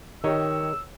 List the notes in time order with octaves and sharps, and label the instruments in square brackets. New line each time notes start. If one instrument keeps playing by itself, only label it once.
[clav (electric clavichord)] D#3 [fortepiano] G4 C#5 D#5 [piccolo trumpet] E6